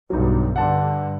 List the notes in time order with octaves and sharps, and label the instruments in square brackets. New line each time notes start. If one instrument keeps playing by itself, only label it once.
[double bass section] B1 G2 [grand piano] F#3 D#4
[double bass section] G2 D3 [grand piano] F#5 A5 C6